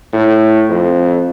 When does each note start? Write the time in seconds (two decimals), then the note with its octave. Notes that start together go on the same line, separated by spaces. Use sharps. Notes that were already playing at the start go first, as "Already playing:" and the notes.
0.13 A2
0.69 F2